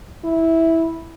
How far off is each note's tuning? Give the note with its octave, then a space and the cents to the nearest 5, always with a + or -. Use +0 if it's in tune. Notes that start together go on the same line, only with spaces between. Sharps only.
E4 -10